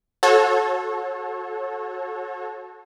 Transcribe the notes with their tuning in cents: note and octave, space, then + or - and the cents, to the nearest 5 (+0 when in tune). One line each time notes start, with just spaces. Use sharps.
F#4 -20 A4 -15 C#5 -35